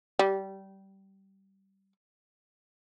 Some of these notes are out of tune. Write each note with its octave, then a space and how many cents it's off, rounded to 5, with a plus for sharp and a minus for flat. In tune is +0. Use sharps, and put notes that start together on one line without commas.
G3 -20